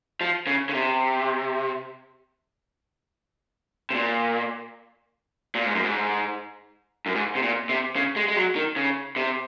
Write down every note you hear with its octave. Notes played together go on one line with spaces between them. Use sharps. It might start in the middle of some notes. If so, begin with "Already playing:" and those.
F3
C#3
C#3
C3
C3
A#2
A#2
G#2
F#2
G#2
F#2
G#2
C3
A#2
C3
C#3
G#3
G#3
F#3
D#3
C#3
C3